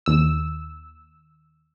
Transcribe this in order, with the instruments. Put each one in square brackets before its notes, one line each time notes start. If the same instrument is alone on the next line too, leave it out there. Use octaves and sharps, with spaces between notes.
[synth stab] D#2 E6